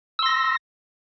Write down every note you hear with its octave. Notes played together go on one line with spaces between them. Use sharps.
C6 E6 A#6